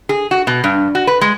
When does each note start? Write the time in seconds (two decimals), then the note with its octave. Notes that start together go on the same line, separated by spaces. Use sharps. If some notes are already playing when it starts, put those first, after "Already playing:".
0.09 G#4
0.31 F#4
0.47 B2
0.64 G2
0.95 F#4
1.07 B4
1.21 G#3